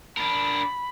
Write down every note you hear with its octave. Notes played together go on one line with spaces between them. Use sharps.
D4 A#4 B5